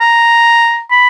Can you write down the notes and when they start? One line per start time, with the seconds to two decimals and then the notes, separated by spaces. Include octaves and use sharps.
0.01 A#5
0.92 B5